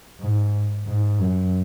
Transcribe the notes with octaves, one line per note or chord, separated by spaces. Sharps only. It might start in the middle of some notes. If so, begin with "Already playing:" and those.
G#2
G#2
F#2